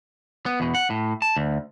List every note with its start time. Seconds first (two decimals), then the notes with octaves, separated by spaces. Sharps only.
0.46 B3
0.60 E2 B2
0.75 F#5
0.90 A2
1.22 A5
1.37 D2